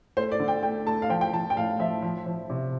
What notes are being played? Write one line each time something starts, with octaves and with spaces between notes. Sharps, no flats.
A3 C5
D5
D3
G5
A3 G5
A3 A5
F5
F3 G5
G5
F3 A5
G5
A2 F5
F3 E5
F3
F3
C3